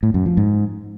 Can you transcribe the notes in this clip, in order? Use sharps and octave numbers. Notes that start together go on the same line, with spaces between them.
A2
F#2
F3
G#2